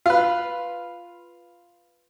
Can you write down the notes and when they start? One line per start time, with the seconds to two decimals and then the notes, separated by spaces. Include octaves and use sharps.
0.06 F4 B4